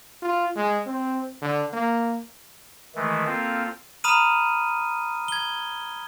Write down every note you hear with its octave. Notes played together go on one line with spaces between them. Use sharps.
F4
G#3
C4
D3
A#3
D#3 E3 G#3 A3
A#3 C4 F4 A4
A#5 B5 D#6 F6 D#7
G#6 G7